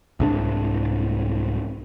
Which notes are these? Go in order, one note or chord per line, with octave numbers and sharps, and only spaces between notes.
C2 G#2 D4